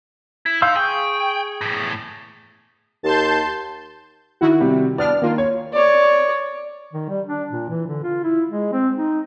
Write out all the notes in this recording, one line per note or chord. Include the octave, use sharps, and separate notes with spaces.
E4
D#4 F5 C6 E6
G#4 G5 C#6
E2 A2
D#2 A5 C6 G6
D#3 E4 F#4
C3 G3
B3 D4 D5 F6
D#3 A#3 F4
C#5
C#5 D5
D#3
G3
D4
A#2
E3
D3
F4
E4
G#3
C4
D#4